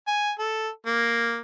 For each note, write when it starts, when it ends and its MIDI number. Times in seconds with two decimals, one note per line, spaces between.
0.07 0.31 80
0.39 0.69 69
0.86 1.40 58